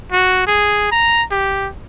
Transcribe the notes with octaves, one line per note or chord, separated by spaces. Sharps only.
F#4
G#4
A#5
G4